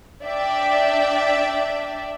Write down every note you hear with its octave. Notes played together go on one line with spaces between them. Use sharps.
D4 D5 E5 G5